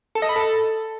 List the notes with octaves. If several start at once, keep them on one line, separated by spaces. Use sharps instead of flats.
A4
D#5
B5
A4